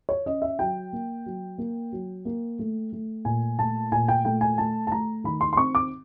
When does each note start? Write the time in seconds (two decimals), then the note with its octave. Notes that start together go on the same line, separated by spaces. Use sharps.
0.09 C#5
0.26 C#4 D#5
0.42 E5
0.59 F#3 G5
0.93 A#3
1.26 F#3
1.58 A#3
1.92 F#3
2.25 A#3
2.59 A3
2.92 A3
3.25 A#2 G#5
3.59 A3 A5
3.92 A#2 G#5
4.08 G5
4.25 A3 G5
4.41 G#5
4.58 A3 A5
4.87 A5
4.92 A3 A#5
5.24 D#3 B5
5.41 C6
5.53 C6
5.57 C4 C#6
5.75 D6